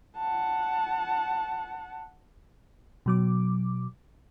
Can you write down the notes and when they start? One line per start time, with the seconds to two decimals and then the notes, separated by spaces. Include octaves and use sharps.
0.17 F#5 A5
3.06 B2 F#3 D6